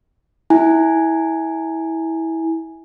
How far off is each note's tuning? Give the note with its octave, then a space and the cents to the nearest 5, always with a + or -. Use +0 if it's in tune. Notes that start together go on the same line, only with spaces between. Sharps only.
E4 -20 G#5 +0